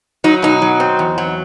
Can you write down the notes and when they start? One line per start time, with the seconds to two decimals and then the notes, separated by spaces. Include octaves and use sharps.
0.24 F#3 D#4
0.42 B2 D#4
0.62 F#3
0.80 C4
0.99 E2
1.18 F#3